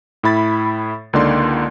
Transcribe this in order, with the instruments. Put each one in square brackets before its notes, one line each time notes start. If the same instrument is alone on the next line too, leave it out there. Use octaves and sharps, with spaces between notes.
[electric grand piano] A2 E4 B5 A6
C#2 D3 A#3 D#4 D5 C6